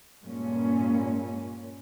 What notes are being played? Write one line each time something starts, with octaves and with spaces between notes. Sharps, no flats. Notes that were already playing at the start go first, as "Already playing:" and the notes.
G2 A#2 G#3 C#4